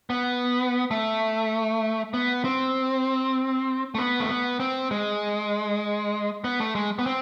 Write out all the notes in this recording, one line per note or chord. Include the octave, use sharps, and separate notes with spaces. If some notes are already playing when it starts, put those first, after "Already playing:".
B3
A3
B3
C4
A3
B3
A3
B3
C4
G#3
B3
A3
G#3
B3
C4